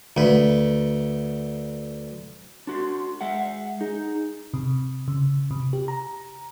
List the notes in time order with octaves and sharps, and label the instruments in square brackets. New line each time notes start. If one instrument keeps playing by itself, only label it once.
[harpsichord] D2 B4
[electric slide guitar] D4 F#4 [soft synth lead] C6
[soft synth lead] G#3 [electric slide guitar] E5 F#5
[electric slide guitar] D#4 [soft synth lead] G#4
[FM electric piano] C3
C#3
C3
G4
A#5